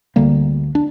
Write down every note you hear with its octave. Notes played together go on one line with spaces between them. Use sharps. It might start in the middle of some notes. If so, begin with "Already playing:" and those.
D2 D3 G3 A#3
D4